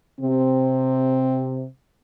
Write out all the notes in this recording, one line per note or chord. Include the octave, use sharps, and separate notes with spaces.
C3 C4